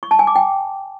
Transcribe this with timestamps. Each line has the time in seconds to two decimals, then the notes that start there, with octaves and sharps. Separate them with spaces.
0.03 C#6
0.11 A5
0.19 G#5
0.27 D6
0.36 G5